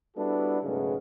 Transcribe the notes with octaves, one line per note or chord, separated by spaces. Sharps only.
G3 B3 D4 E4 F#4 A4
B1 G#2 C#3 G#3 A3 B3